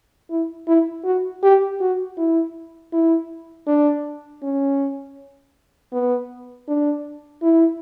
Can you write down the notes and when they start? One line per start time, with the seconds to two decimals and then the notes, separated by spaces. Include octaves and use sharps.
0.30 E4
0.67 E4
1.04 F#4
1.43 G4
1.81 F#4
2.18 E4
2.93 E4
3.67 D4
4.42 C#4
5.92 B3
6.68 D4
7.42 E4